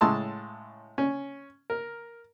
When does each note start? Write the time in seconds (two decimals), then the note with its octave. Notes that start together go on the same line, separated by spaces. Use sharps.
0.01 A2 C#3 G#3 A5 C6 E6
0.98 C#4
1.70 A#4